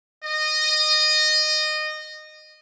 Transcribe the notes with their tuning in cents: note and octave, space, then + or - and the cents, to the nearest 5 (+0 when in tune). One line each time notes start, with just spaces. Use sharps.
D#5 -20